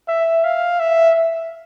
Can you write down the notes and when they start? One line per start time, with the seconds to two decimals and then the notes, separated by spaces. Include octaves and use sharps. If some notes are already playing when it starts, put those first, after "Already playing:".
0.08 E5
0.44 F5
0.80 E5